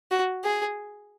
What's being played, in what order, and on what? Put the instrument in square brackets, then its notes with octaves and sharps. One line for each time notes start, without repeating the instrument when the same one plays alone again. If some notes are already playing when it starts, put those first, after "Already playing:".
[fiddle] F#4
G#4